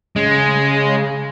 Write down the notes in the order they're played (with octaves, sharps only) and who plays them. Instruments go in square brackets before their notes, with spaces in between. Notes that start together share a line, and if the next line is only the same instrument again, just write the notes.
[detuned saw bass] C#3 [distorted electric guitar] G#3